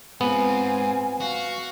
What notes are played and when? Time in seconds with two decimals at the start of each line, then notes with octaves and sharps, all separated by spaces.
0.21 G#2 B3 C4 F4 G#5
1.21 F#4 F5 C#6